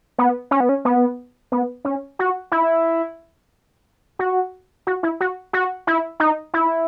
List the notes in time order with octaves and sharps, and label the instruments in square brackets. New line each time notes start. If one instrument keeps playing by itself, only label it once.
[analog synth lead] B3
C#4
B3
C#4
B3
B3
C#4
F#4
E4
F#4
F#4
E4
F#4
F#4
E4
D#4
E4